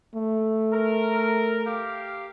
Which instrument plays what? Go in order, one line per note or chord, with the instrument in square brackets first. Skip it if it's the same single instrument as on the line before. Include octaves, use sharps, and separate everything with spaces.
[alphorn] A3
[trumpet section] A#4
G4 F5